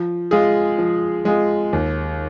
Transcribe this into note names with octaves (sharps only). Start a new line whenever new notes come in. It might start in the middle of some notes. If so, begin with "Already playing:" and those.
Already playing: F3
G#3 F4 G#4
F3
G#3 F4 G#4
D#2